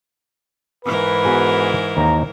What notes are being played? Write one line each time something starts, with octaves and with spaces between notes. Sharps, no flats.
G#2 E3 A#4 B4
B3 F#4 G#4
D#2 D#4 A#5